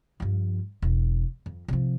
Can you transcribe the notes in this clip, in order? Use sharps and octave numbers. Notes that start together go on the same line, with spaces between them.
G2 F3
E1
F2
C3 F3